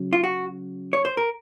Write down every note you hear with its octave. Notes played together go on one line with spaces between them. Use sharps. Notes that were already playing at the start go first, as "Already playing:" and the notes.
Already playing: C#3 F#3
F4
F#4
C#5
C5
A#4